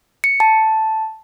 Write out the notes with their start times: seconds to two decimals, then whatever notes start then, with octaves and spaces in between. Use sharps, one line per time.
0.24 C#7
0.40 A5